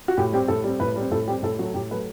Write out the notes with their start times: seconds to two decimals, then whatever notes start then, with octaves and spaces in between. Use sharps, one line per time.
0.08 F#4
0.17 A2 G4
0.32 G3 C4 G4
0.48 A2 A4
0.64 G3 C4
0.80 A2 B4
0.96 G3
1.01 C4
1.11 A2 A4
1.27 G3 C4 G4
1.43 A2 A4
1.59 F#3 A3 F#4
1.74 A2 G4
1.91 F#3 A3 B4